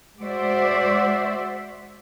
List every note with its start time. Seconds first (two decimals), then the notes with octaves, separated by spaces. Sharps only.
0.19 G#3 F#4 C5 D5 E5